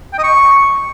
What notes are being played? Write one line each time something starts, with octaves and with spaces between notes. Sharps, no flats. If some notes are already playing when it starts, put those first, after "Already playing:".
G5
D#5
C#6